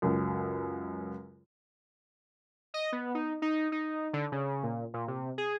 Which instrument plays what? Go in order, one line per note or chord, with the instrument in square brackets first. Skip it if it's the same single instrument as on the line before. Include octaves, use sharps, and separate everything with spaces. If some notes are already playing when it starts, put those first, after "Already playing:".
[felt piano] C#2 F#2
[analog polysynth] D#5
B3
D#4
D#4
D#4
D3
C#3
A#2
A#2
C3
G#4